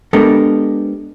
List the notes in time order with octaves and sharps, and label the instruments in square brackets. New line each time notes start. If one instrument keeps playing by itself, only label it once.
[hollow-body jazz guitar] G#3 B3 D4 G4 A4 A#4